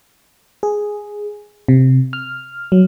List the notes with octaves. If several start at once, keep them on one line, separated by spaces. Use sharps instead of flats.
G#4
C3
F6
F#3